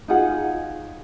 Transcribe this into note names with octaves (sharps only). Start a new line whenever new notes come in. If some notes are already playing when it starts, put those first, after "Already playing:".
D#4 F4 G#4 F#5